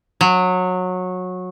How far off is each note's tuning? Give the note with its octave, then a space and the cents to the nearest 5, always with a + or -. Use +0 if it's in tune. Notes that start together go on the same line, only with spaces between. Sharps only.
F#3 -20